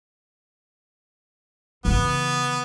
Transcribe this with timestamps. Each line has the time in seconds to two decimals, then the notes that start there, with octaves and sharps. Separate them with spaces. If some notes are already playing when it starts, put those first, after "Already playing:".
1.85 C#3 E3 B3